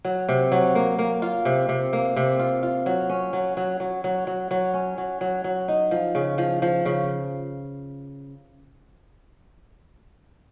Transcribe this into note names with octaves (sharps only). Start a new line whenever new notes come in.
F#3
C3
F#3
A#3
A#3
F4
C3
C3
A#3
C3
F4
F4
F#3
C#4
F#3
F#3
F#3
F#3
F#3
F#3
C#4
F#3
F#3
F#3
D#4
F3
C#3
F3
F3
C#3